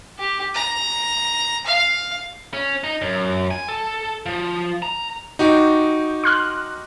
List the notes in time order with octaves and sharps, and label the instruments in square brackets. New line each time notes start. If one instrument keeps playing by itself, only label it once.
[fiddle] G4
A#5
F5
[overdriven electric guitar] C#4
D#4
F#2
G#5
A4
F3
A#5
[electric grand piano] D#4 F#4 G4
[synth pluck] C6 F6 F#6